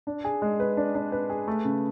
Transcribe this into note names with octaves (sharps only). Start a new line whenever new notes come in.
D4
G#4
G#3
B4
D4
D4
B4
G#4
A3
C#3